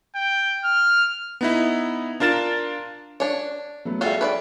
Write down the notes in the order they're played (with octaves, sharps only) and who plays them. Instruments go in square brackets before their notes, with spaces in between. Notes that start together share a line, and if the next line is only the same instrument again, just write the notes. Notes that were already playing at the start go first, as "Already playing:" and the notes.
[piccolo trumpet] G5
F6
[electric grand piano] B3 D#4 E4
D4 F4 A#4 A6 E7
[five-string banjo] D4 C#5
[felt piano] F#3 A3 B3
[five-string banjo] G3 F4 F#4 [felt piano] G#4 A4 E5
[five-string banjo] B4 C#5 D5